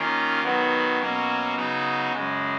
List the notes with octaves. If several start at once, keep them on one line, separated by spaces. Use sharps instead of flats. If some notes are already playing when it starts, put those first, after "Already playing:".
Already playing: D#3 A#3 C#4 F4
D#3 F#3 B3
B2 F#3 A#3 C#4
C#3 F#3 B3 D#4
F#2 C#3 G#3